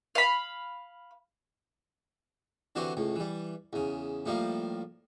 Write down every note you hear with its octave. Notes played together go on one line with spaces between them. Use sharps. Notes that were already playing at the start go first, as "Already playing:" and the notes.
F5 B5
D3 E3 C4 F#4 G4
C#2 A2
E3 G3
E2 C#3
A2 F3 G3 A#3